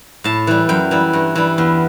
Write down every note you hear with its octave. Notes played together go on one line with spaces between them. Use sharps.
A2 A5
E3 G3
F#2 G5
E3 G3
G2
E3 G3
E2